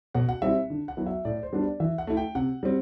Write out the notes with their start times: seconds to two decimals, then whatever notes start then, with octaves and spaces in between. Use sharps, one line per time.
0.14 B2 F#5
0.29 F#5
0.42 G3 C4 E4 E5
0.70 D3
0.88 F#5
0.97 F#3 B3 E4
1.06 E5
1.25 A2 D5
1.43 C5
1.53 G3 B3 D4
1.62 D5
1.80 E3 E5
1.98 F#5
2.07 A3 E4
2.17 G5
2.35 C3 F#5
2.63 G3 C4